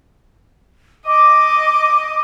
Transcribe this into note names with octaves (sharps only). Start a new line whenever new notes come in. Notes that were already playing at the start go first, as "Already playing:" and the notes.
D#5 D6